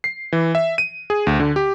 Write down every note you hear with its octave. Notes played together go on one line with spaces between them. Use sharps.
C7
E3
E5
D#7
G#4
D2
D3
G4